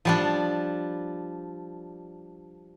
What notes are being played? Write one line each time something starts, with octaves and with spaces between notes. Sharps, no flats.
F3 G3 D4